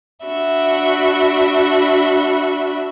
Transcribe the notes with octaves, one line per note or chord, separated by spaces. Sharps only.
D4 F#4 E5 B5